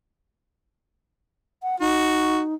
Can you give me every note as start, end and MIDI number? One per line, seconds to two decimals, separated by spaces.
1.62 1.76 78
1.80 2.55 63
1.80 2.40 66